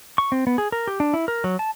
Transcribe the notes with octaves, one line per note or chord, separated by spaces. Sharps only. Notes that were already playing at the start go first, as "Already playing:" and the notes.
C#6
C4
B3
G#4
A#4
G4
D4
E4
A#4
F#3
A5